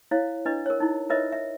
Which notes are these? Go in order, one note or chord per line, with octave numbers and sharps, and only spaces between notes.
E4 C#5 F5
D4 E4 B4 D#5
A#4 C#5
D#4 E4
F4 A#4 B4 C#5 D#5 E5
E5